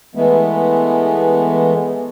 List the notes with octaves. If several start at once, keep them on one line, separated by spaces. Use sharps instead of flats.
E3 G#3 A3 B3